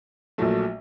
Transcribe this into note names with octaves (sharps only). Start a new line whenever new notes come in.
A#1 A#2 F#3 A3